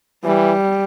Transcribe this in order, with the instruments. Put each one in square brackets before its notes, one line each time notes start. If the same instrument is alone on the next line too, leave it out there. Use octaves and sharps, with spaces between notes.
[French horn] E3 [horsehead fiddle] G3